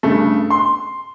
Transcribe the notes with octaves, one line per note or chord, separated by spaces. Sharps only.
G2 C#3 A3
C6